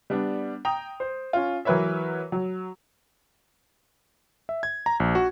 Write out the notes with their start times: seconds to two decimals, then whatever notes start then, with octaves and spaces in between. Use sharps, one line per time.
0.10 G3 B3 D4
0.65 G5 A#5 D#6 F7
1.00 C5
1.33 C#4 F4
1.65 E3 F#3 A#4 B4 C#5 E5
2.32 F#3
4.49 E5
4.63 G#6
4.86 A#5
5.00 A#1
5.15 F#4